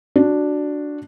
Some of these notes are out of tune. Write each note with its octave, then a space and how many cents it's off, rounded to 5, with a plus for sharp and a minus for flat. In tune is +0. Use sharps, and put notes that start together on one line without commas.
D4 +0 F#4 -5